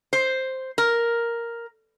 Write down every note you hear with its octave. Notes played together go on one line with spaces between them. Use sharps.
C5
A#4